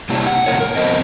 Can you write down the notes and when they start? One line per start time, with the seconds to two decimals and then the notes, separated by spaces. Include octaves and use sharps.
0.09 C3 A#3 C#4 D4 E4 G4
0.27 F#5
0.46 A#2 C#3 A#3 A#4 C#5
0.60 A#4
0.76 F3 B3 C4 B4 C5 D#5